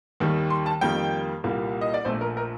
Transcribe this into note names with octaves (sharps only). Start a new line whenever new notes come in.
D#2 D#3 G3
C6
A5
F2 D#3 G3 A#3 G5
C2 A#2 G3 A#3
D#5
D5
A#1 A#2 A3 C5
A#4
A#4